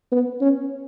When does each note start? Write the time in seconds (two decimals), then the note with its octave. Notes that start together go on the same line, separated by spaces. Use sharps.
0.12 B3
0.41 C#4